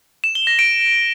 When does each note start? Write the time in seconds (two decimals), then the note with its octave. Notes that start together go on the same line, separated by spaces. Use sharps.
0.24 E7
0.35 G7
0.47 A#6
0.59 D7